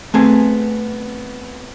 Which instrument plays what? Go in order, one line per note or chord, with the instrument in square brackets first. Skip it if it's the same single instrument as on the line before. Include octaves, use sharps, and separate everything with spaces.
[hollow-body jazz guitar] A3 B3 C4 G#4 G#5